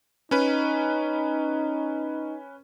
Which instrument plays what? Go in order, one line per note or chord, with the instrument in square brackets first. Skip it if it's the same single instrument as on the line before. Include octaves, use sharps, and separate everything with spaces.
[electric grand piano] C#4 B4 [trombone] D#4